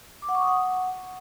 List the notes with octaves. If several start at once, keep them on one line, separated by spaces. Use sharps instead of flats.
D6
F#5
C#6
D#6
F#5